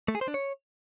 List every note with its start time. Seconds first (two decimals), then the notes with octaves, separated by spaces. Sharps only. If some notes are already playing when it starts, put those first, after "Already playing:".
0.08 A3
0.15 G#4
0.21 C5
0.28 D4
0.34 C#5